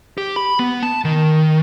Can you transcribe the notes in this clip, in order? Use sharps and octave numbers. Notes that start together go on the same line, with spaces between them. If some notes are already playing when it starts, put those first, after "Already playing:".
G4
B5
B3
A5
D#3